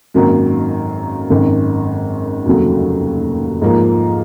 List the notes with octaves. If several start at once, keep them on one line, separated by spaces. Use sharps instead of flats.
G#1 F#2 D#3 F#3 A#3
G#1 F#2 D#3
F1 D#2 C#3 F#3
G#2 F3 A#3 F4